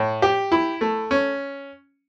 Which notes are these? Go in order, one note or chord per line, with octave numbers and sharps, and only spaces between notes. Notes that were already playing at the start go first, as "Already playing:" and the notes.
Already playing: A2
G4
E4
A3
C#4